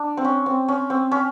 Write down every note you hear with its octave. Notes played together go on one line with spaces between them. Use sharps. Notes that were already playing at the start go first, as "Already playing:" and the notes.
Already playing: D4
C4
C#4
C4
C#4
C4
C#4